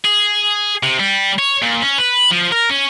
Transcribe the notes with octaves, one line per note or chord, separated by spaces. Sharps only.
G#4
C3
G3
C#5
A#2
C#4
B4
F3
A#4
C#4